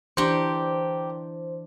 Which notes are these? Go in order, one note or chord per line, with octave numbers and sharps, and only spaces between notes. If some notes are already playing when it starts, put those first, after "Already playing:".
E3 D4 G4 A#4 C5 C#6